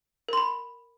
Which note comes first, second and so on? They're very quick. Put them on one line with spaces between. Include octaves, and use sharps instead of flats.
A#4 C6 B5